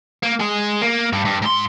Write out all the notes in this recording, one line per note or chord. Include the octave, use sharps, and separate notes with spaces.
A#3
G#3 G#4
A#3
G2
G2
G#2 C6